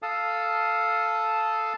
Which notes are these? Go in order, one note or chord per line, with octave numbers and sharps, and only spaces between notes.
A4 F5 A5 D#6